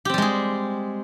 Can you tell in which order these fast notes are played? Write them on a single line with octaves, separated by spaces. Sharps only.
G4 C4 G3 G#3 G#4